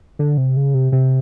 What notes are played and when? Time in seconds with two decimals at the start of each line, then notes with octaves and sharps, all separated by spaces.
0.19 D3
0.37 C3
0.57 C#3
0.74 C3
0.92 C3